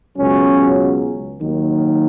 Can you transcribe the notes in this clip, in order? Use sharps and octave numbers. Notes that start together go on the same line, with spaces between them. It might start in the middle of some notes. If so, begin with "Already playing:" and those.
C#2 B2 F#3 C#4
D#2 D#3 F#3